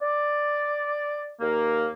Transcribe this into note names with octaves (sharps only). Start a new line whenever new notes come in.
D5
D#2 A#3